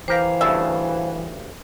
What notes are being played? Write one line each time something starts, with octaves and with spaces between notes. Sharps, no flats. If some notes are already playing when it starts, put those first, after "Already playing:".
E3 G4 A#4 C5 F5
D2 G2 C#3 E5 A5